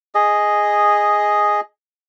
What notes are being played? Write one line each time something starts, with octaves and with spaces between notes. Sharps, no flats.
G#4 D#5